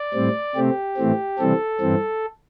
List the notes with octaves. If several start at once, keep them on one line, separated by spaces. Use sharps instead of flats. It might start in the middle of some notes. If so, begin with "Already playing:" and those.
Already playing: D5
A2 G3 C4
C3 A3 C4 G4
A2 E3 A3 C4
C3 E3 G3 C4 A4
G2 E3 C4